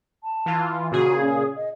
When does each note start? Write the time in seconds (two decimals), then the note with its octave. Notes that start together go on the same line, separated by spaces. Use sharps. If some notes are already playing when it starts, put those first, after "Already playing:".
0.24 A5
0.46 E3 F4
0.92 A#2 C#3 F#4 G#4
1.21 C#4
1.56 D#5